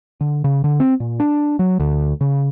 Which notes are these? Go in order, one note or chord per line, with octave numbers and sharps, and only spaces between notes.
D3
C#3
D3
C4
A#2
D4
F#3
D2
C#3